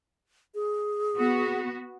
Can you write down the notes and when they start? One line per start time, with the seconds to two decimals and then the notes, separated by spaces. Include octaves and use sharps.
0.55 G#4
1.18 B3 F#4